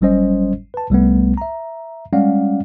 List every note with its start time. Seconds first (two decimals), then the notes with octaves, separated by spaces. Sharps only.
0.01 G1 F#3 G3 C#4 C5 D#5
0.74 B4 A5
0.90 C2 G3 A3 B3
1.37 E5 A#5
2.12 G3 G#3 C#4 D5 F5 F#5